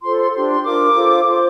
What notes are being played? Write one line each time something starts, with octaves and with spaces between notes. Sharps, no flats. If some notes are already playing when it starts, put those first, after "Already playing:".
F4 A4 C5 C6
C6
D4 G4 C5 C6
C6
D4 F4 A#4 D6
F4 A4 C5
F4 C5 D6